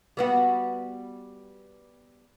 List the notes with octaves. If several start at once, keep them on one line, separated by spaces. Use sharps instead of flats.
G3 B3 F#4